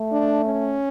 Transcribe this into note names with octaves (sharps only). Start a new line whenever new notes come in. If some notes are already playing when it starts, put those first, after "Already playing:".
Already playing: A3
D4
C#4